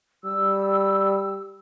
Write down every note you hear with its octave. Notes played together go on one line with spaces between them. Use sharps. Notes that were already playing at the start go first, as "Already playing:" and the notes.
G3 E6